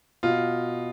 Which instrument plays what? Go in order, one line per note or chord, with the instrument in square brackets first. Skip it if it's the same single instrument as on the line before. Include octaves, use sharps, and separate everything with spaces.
[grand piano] B2 F4